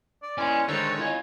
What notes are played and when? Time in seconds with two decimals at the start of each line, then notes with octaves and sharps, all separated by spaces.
0.23 D5
0.38 C#4 E4 B4 D5 G#5 C6
0.68 D3 D#3 G#3 A4 A#4 C5 C#5
0.99 E4 F4 D#5 G#5